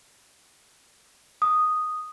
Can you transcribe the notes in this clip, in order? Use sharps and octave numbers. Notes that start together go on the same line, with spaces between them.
D#6